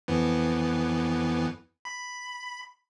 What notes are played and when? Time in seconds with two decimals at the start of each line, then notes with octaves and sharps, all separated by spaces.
0.08 F2 E3 B3
1.85 B5